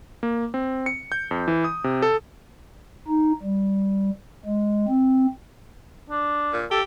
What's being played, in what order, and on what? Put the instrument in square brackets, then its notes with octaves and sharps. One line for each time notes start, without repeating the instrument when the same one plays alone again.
[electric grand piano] A#3
C4
C#7
G6
F2
E3
D#6
C3
A4
[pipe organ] D#4
G3
G#3
C4
[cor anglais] D4
[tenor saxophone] A#2
[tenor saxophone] G4 [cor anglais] A4